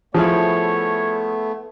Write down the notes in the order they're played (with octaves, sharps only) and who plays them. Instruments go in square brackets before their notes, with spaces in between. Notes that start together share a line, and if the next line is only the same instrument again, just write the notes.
[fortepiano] F3 [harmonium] A3 B3 [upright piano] E4 G#4 C5 [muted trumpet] C#5